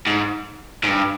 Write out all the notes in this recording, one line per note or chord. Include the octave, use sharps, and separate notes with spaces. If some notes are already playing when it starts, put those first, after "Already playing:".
G#2
G#2
G2